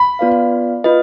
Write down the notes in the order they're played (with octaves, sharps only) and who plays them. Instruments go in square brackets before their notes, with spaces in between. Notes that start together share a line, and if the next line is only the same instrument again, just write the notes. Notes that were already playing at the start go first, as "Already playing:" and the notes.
Already playing: [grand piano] B5
[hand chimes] B3 F4 B4 D5 F5
F4 B4 D#5